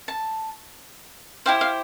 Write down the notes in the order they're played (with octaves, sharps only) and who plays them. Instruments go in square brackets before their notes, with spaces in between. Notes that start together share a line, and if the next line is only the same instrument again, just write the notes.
[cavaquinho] A5
E4 G4 C5 F5
F5